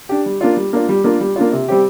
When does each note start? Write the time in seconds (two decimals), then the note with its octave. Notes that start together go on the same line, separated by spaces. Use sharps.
0.09 D4 G4
0.26 G3
0.41 A#3 D4 F4
0.57 G3
0.73 A#3 D4 F4
0.89 G3
1.04 A#3 D4 F4
1.21 G3
1.36 A#3 D4 F4
1.52 C3
1.68 G3 C4 G4